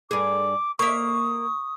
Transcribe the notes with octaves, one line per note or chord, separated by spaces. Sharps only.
G2 G#4 D6
A#3 E5 C#6 D#6